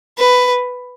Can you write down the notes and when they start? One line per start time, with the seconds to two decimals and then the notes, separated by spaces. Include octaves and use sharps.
0.19 B4